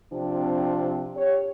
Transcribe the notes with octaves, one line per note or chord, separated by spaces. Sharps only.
C3 F3 C4 D4
G4 C#5